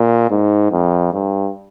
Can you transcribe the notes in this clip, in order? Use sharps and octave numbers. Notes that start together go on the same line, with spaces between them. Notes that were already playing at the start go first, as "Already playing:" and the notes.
Already playing: A#2
G#2
F2
G2